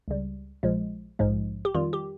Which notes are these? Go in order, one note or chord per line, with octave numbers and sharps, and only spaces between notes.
C#2 C#3 G3
A#1 A#2 F3 G#3
A#1 G#2 F3 G#3
G4
F2 D#3 G3 F4
G4